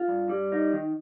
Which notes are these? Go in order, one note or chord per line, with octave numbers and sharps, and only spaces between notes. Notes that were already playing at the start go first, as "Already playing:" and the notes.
Already playing: F4
G2
G3
D#4
D#3